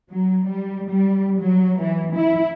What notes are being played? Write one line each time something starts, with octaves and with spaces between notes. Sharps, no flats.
F#3
G3
G3
F#3
E3
E4